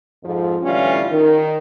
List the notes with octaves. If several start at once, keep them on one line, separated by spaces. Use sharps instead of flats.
F2 G#2 F3
A2 D3 E3 G3 C#4 F4
D#3